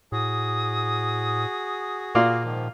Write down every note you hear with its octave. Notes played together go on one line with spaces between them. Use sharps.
A2 F#4 G#4 D#6
A#2 A#3 F4 D5
G#2 D#3 F3